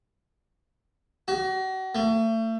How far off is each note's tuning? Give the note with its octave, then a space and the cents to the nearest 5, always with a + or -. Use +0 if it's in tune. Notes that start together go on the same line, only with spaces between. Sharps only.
F#4 +35
A3 +35